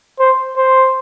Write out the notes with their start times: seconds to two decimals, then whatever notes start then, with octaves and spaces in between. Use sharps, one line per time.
0.19 C5
0.57 C5